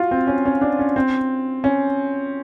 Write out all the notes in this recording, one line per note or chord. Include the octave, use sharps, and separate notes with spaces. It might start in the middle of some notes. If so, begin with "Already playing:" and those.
Already playing: F4 F#4
C4
C#4
C#4
D4
C#4
C4
C#4